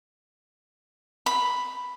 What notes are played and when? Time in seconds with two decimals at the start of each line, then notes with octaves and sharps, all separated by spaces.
1.26 B5